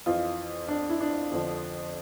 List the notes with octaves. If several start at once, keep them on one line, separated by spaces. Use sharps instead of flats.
F2 E3 F4
D4
E4
D4
F2 D3 F3